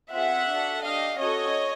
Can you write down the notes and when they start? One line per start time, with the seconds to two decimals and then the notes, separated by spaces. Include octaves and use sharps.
0.12 C4 F4 G#4 E5 F#5
0.48 D4 F#4 A4
0.83 D4 G4 D#5 F5
1.19 C#4 F#4 A4 C#5 D#5